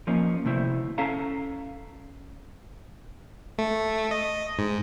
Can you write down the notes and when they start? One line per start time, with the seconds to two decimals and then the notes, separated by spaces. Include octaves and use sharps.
0.07 F3 A#3 C#4 D#4
0.45 D2 C3 A3 E4 C5
0.98 C#4 A4 E5 F5 A5 A#5
3.58 A3
4.11 D#5
4.59 G#2